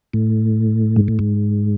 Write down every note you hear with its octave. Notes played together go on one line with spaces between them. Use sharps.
A2
G#2
A2
G#2